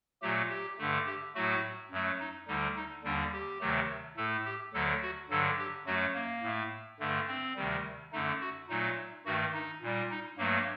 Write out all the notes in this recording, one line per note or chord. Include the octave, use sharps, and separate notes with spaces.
A#2 F#3 A3 G4
G4
G2 D3 A3
G4
A2 F#3 A3 F#4
F#2 F#3 A3
D#4
D2 D3 G3 D#4
D#4
D#2 D3 G3 D4
G4
D2 C3 D#3 F#3 A3
A2 A3 A4
G4
D2 D3 F#3 A4
F#4
G2 D3 F#3 A4
G4
F#2 F#3 A3 F#4
A#3
A2 A3
G2 D3 A3
C4
D2 C3 D#3 G3
F#2 D3 A3 D#4
F#4
A#2 F#3 A3 D#4
G2 D#3 A3 F#4
D#4
A#2 G3
D#4
G2 F#3 A3 A#3